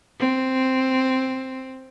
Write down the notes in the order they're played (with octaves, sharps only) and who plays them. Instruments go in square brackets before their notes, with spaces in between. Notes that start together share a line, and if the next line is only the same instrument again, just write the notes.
[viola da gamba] C4